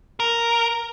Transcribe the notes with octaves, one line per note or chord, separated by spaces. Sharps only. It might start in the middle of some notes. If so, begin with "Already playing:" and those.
A#4